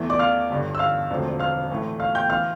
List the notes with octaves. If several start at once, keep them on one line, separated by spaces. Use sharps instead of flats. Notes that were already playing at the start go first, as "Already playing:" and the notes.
Already playing: E2 E3 A3 E4
D5 D6
F5 F6
G1 G2 D3
E6
F5 F6
E1 D2 D3 F3 C4
F5 F6
A2 E3 A3 E4
F5 F6
G5 G6
E3 F5 F6